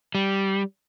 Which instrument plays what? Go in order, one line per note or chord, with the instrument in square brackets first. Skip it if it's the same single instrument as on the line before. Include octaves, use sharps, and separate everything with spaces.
[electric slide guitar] G3